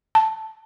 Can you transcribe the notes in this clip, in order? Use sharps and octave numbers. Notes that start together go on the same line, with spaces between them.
A5